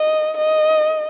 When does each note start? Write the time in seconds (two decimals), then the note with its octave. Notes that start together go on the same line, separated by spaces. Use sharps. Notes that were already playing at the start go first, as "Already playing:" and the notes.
Already playing: D#5
0.37 D#5